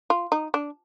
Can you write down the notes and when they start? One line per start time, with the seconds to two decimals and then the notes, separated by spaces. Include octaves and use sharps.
0.10 F4
0.32 D#4
0.54 D4